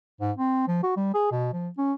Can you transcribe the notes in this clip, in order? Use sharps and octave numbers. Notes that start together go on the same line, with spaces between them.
G#2
C4
F3
F#4
G3
G#4
B2
F3
C#4